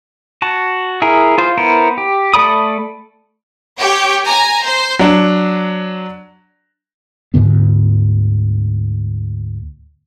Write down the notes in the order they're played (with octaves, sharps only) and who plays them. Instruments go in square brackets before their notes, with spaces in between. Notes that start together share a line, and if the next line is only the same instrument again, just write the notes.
[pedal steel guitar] F#4 A5
E4 G#4 A#4
F4 C5
B3 E4 A#4 C5
G4
A3 A4 D5 B5 D#6
[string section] G4 C#5
G#5 A#5
C5
[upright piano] F#3 D4
[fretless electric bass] D2 G#2 D3 B3